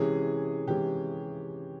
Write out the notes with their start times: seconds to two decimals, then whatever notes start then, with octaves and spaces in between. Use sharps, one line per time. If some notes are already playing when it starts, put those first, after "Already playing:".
Already playing: C3 E3 G#3 C#4 G#4
0.67 C3 E3 G#3 C#4 G4